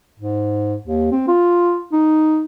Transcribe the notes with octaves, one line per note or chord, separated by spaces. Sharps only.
G#2
D#2
C4
F4
D#4